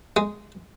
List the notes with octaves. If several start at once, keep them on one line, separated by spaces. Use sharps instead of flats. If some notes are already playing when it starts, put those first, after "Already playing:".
G#3